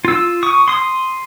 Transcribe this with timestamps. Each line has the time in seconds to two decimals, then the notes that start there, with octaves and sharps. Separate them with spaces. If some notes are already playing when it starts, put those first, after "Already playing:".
0.05 F4 E6
0.43 C#6 D#6
0.68 C6 D#6